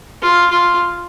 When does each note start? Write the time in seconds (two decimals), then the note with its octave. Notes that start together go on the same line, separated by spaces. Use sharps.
0.22 F4
0.50 F4